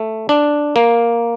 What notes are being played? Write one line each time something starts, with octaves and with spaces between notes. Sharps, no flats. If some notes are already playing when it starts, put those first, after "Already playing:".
Already playing: A3
D4
A#3